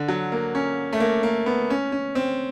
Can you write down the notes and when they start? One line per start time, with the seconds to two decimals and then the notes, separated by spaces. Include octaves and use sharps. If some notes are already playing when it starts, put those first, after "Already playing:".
Already playing: D3
0.08 F#3
0.32 A#3
0.55 C#4
0.93 A3
1.00 A#3
1.23 A#3
1.46 B3
1.70 C#4
1.92 C#4
2.15 C4